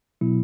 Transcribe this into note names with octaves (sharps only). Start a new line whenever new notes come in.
B2 F#3 B3 E4